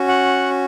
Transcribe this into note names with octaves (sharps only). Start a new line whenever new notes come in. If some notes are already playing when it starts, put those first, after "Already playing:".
Already playing: C#4 F#4
F#5